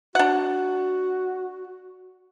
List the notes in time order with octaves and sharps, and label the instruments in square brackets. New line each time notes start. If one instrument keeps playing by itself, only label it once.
[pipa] D4 F#5 [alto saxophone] F#4